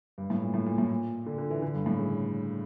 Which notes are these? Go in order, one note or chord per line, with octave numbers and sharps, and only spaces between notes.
G2
A2
A#2
A2
A#2
A2
A#2
D3
D3
E3
D3
G2
A2
C#3